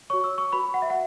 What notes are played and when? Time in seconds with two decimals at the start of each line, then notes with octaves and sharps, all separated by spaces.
0.10 F#4 C#5 C#6
0.24 E6
0.38 C#6
0.53 F#4 B4 B5
0.74 F#5
0.82 E5
0.90 F#5